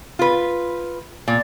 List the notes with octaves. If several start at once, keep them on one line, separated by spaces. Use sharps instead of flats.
F4 B4
A#2